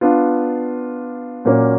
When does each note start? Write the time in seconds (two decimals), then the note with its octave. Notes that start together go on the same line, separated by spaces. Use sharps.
0.01 B3 D4 F4
1.45 A#2 F#3 A#3 C#4